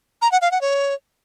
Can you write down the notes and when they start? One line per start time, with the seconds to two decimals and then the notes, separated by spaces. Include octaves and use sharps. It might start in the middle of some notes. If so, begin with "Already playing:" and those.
0.22 A#5
0.31 F#5
0.41 F5
0.51 F#5
0.61 C#5